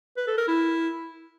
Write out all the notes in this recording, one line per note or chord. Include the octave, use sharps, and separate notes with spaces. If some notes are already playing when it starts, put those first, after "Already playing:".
B4
A4
A#4
E4